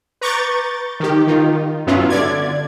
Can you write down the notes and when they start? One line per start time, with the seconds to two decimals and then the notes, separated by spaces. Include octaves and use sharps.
0.21 B4 A#5 C#6 D6 G6 A6
1.00 D#3 G4
1.27 D#3 D#4 F4
1.86 G2 F#3 B3 C#4 E4 F4
2.10 D3 D5 G#6